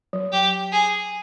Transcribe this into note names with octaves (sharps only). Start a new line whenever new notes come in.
F#3
G4
G#4